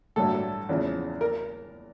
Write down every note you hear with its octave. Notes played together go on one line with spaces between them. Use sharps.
A1 G2 D3 F#3 A3 A4
E2 C#3 F3
A#4